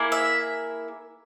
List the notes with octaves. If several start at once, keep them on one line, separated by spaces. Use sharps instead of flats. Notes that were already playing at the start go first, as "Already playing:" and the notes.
Already playing: A#3 E4 G#4
E5